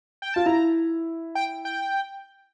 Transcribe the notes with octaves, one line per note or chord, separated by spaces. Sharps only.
G5
F4 A5
E4 A#5
G5
G5